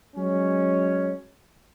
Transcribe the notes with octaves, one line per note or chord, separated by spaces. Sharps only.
F#3 G#3 C#4